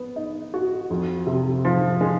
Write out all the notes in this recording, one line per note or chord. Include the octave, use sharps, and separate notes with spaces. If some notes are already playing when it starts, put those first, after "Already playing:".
Already playing: B3
D#4
F#4
F2
C3
F3
G#3